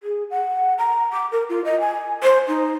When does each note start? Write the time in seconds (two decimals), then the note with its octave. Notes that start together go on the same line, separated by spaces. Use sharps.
0.03 G#4
0.31 F#5
0.78 A#5
1.13 D6
1.32 A#4
1.49 F4
1.65 D#5
1.80 G#5
2.23 C5
2.48 D#4